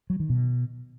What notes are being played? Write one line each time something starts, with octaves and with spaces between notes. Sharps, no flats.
F#3
D#3
B2